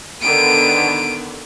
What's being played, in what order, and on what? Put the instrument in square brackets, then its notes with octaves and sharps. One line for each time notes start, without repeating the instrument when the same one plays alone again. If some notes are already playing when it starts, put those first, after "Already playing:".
[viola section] D3 D#3 B3 [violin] D7 D#7